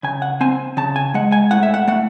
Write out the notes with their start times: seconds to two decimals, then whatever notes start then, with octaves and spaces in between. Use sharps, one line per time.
0.03 C#3 G#5
0.22 F#5
0.41 C4 G#5
0.77 C#3 A5
0.96 G#5
1.14 G#3 F#5
1.32 G#5
1.51 A2 F#5
1.63 E5
1.74 F#5
1.88 A3 F#5